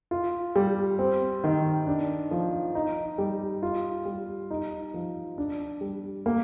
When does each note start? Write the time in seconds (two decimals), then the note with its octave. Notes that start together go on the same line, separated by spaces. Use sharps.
0.11 F4
0.56 G3
0.99 C4
1.44 D#3
1.87 D4
2.31 F3
2.75 D#4
3.18 G3
3.63 F4
4.06 G3
4.51 D#4
4.94 F3
5.38 D4
5.81 G3
6.26 A#3